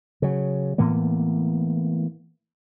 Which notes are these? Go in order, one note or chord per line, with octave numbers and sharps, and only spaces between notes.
C#3 F#3
A2 E3 A#3 B3